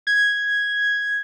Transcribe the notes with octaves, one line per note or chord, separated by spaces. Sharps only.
G#6